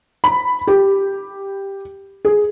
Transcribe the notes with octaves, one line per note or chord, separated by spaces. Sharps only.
B5
G4
G#4